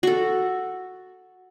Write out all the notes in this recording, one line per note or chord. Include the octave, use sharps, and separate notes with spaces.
F#4 A4